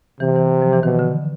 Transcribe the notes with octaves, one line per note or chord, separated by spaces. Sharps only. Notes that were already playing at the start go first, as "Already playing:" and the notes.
C3 E3
E3
F3
E3
B2 D#3
D3